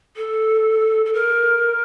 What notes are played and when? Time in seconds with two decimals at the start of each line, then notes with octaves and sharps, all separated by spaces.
0.16 A4
1.05 A4
1.13 A#4